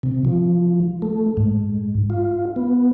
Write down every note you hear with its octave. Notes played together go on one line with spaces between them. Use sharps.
C3
F3
A3
G#2
F4
B3